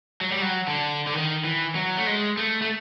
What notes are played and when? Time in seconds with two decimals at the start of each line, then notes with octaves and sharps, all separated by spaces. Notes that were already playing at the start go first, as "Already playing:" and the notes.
0.21 F#3
0.32 G3
0.42 F#3
0.67 D3
1.07 D3
1.14 D#3
1.44 E3
1.75 F#3
1.97 A3
2.07 G#3
2.37 A3
2.62 A3